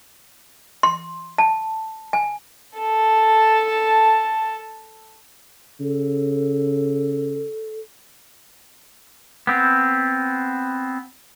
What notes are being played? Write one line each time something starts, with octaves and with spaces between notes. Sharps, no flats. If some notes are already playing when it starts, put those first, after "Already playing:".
C6
A5
G#5
A4 A5
C#3 A4
B3 C4